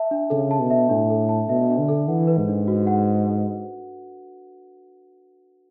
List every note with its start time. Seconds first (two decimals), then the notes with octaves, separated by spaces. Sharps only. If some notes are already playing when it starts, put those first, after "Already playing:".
Already playing: E5 A5
0.11 D4
0.30 C#3 A4
0.51 A5
0.60 B2
0.70 E5
0.89 A2 D4
1.10 A4
1.29 A5
1.49 B2 E5
1.69 D4
1.78 D3
1.88 A4
2.08 E3 F#5
2.27 B4
2.38 G#2
2.48 D4
2.68 F#4
2.87 F#5